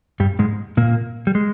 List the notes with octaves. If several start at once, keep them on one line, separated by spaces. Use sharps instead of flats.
G2 G3
G#2 G#3
A#2 A#3
G3
G#3